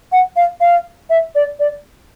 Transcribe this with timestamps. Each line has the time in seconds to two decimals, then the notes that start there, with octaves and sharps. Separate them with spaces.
0.12 F#5
0.36 F5
0.61 F5
1.10 E5
1.35 D5
1.60 D5